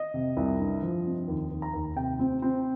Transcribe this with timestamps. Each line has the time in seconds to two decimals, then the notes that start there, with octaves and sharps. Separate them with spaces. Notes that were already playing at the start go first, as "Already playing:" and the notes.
Already playing: D#5
0.14 C3
0.37 C2
0.60 G2
0.83 F3
1.06 C4
1.28 D#2
1.51 D#2
1.62 A#5
1.73 D#2
1.96 C3 G5
2.19 C4
2.42 C4